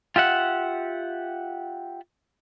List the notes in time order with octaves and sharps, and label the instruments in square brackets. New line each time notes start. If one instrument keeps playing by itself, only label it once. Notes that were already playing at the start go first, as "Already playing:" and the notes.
[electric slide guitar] F4 G4 E5 F#5